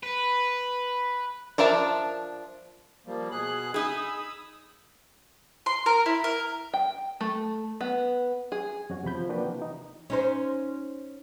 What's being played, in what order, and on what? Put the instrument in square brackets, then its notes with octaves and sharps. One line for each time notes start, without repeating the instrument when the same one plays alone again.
[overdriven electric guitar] B4
[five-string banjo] F3 D4 A#4 E5 A5
[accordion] F3 G3 A#3
B2 G#4 F#6
[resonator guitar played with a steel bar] D#4 G#4 [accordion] B5 D#6 E6
[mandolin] C6
A#4
E4
A#4
[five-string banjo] G5
A3
B3
G#4
[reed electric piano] F2 C#4 F#4
E2 C3 F3 B5 G6
F3
A#3 D4 F4 F#4 B4 G5
C3 E3
D#4
[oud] C#4 D#4 C5